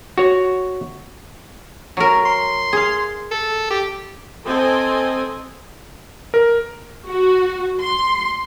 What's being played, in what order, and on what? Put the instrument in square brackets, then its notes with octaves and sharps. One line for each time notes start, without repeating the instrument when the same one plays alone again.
[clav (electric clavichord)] F#4 C#5
[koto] F#3 A#4
[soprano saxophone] C6
[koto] G#4 F5
[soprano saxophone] A4
G4
[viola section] C4 A4 D#5 G#5
[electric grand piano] A#4
[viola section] F#4
C6